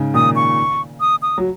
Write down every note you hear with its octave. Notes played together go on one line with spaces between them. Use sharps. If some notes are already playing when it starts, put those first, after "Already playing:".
Already playing: G#2 C#3
A#2 D#3 D#6
C#6
D#6
D#6
F#3